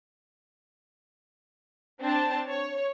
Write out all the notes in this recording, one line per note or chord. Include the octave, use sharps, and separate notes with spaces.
C4 D4 C5 A5
C#5